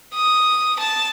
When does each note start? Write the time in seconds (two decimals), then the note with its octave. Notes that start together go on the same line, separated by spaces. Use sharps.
0.14 D#6
0.79 A5